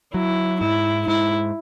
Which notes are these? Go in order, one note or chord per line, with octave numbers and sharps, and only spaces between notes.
F#3 E4
G#2 E4
G#2 E4